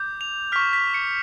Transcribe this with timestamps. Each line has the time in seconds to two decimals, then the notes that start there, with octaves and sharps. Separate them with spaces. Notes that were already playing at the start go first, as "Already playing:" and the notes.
Already playing: D6 G6
0.21 F7
0.52 C#6 F6 B6
0.73 B6
0.94 C#7